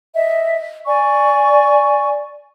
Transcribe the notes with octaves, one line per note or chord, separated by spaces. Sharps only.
D#5 E5
D5 G#5 C#6